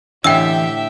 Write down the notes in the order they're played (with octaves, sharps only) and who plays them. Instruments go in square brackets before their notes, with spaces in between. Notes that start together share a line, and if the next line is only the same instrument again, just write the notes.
[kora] A2 D3 [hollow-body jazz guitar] E3 D#5 [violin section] G4 E5 [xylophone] G5 E6